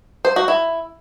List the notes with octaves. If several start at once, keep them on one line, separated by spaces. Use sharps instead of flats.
C5
F#4
E4